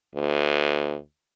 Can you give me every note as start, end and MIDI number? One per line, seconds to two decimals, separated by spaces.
0.15 0.97 38